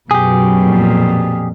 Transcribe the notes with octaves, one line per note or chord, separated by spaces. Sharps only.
F#2 B2 G4 G#4
F2 A#2